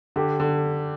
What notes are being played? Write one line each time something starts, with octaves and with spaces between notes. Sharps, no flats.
D3 G4
D3